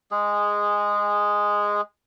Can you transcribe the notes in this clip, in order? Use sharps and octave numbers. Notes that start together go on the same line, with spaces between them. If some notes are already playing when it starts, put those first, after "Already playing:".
G#3 G#4